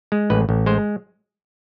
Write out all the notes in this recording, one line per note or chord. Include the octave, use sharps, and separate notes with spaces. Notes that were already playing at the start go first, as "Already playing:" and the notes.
G#3
A1 B4
A1
G#3 C5